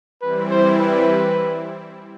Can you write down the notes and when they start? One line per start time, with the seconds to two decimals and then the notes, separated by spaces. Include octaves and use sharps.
0.22 E3 G3 C4 E4 B4
0.51 C5
0.79 B4